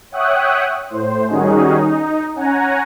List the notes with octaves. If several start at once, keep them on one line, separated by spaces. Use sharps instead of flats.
C#5 E5 F#5 G5 D#6 F#6
A2 C5
D#3 G3 C#4 D#4 F#4 G#4
D#4
C#4 F#5 G#5 A#5